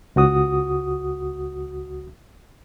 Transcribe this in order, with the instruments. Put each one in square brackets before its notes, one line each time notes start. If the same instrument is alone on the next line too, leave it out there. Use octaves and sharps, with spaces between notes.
[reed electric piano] C#2 F#4 D#6